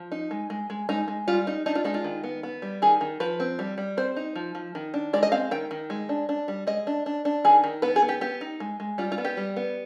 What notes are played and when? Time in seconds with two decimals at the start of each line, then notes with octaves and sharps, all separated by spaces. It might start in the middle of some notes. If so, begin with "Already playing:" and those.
Already playing: F3
0.12 D#4
0.31 G#3
0.50 G#3
0.70 G#3
0.89 G#3 D#4
1.08 G#3
1.27 G3 F4
1.47 D#4
1.66 D4 D#4
1.75 F4
1.84 G#3 D#4
1.94 F4
2.04 D#3
2.24 B3
2.43 B3
2.62 G3
2.82 D#3 G#4
3.01 D#3
3.20 F3 B4
3.40 C4
3.59 G3
3.78 G3
3.97 C4 C5
4.16 D#4
4.35 F3
4.55 F3
4.75 D#3
4.94 D4
5.13 G#3 D5
5.23 D#5
5.32 C4 F5
5.51 D#3 G5
5.71 D#3
5.90 G#3
6.09 D4
6.29 D4
6.48 G3
6.67 G#3 D#5
6.87 D4
7.06 D4
7.25 D4
7.44 D#3 G#4
7.64 D#3
7.82 B3 B4
7.96 G#4
8.02 B3
8.09 G4
8.21 B3 G4
8.41 D#4
8.60 G#3
8.80 G#3
8.98 G3 F4
9.12 F4
9.18 B3
9.25 G4
9.37 G3
9.56 B3